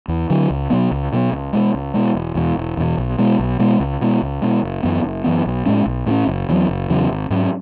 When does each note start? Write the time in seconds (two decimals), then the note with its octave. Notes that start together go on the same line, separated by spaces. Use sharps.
0.08 E2
0.30 D3 F#3
0.50 C#2
0.70 B2 F#3 B3
0.91 C#2
1.13 B2 F#3 B3
1.32 C#2
1.53 B2 G#3
1.74 C#2
1.94 B2 G#3
2.15 E1
2.35 E2 B2
2.57 E1
2.77 E2 B2
2.98 B1
3.19 B2 G#3
3.39 B1
3.59 B2 G#3
3.80 C#2
4.01 B2 G#3
4.22 C#2
4.42 B2 G#3
4.63 F#1
4.83 F#2 E3 B3
5.04 F#1
5.24 F#2 E3 B3
5.46 B1
5.66 A2 G#3 C#4
5.86 B1
6.06 A2 G#3
6.11 C#4
6.27 F#1
6.49 E2 C#3
6.52 F#3
6.69 F#1
6.90 E2 C#3 F#3
7.11 G#1
7.30 G#2 F#3 C#4